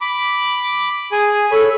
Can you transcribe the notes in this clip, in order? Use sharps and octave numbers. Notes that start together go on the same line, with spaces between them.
B5 D6
G#4 G#5
A4 C#5 B5